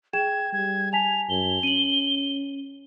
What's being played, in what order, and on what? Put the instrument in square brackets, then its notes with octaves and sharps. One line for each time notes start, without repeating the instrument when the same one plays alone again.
[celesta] G#4 G5 E7 [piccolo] G#6
[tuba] G3 [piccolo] G#6
[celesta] G#5 A5 B6 [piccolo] F7
[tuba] F#2 [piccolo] G7
[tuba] C#4 [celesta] D#7 F#7